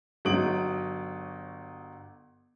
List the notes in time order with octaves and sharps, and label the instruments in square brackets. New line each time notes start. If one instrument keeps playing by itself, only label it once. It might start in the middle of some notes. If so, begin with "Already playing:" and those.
[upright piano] G1 F#3 D#4 D#6 D7 F#7